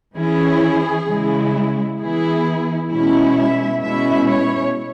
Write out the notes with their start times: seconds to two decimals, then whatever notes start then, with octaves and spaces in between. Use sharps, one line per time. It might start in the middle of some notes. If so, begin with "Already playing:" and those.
0.17 E3 C#4 E4 G#4
1.08 C#3 G#3 E4
1.99 E3 B3 E4 G#4
2.91 B2 G#3 C#4 E4
3.37 E5
3.82 B2 G#3 C#4 E4 E5
4.28 C#5